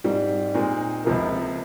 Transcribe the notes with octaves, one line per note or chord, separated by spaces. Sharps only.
G#2 G3 C4
A#2 G#3 C4 D#4
C#2 C3 F3 A#3